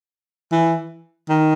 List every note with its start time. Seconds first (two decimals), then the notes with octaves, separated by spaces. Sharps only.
0.52 E3
1.29 D#3